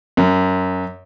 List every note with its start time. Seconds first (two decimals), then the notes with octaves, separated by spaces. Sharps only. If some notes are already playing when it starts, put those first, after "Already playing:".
0.17 F#2